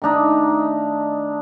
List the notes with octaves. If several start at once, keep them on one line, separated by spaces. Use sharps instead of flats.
D#3 A3 D4 D#4